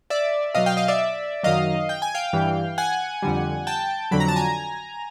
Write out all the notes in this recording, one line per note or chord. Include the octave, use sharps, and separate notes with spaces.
D5 E5
B2 F#3 D#5 F5
F5 G5
D#5 F5
D5 E5
F#2 D#3 F#3 D#5 F5
G5
G#5
F5 G5
G2 E3 G3
F#5 G#5
F2 D3 G3
G5 A5
F2 D3 F#3 B5
A#5
A5
G#5 A#5